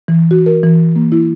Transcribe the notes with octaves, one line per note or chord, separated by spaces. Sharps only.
E3
F#4
A#4
E3
A#3
E4